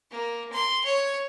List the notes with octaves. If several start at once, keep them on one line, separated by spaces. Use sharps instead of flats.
A#3
C6
C#5